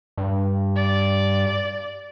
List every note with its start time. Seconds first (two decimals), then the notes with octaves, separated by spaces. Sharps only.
0.17 G2
0.76 D5